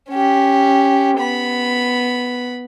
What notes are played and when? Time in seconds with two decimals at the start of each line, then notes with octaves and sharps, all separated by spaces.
0.10 C#4 G4
1.18 B3 B5